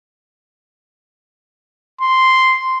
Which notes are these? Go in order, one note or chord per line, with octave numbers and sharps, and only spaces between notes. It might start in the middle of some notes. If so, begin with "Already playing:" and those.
C6